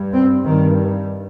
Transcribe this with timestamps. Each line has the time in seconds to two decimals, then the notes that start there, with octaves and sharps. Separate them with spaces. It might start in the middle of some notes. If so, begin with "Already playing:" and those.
Already playing: G2
0.12 C4
0.44 G2 D#3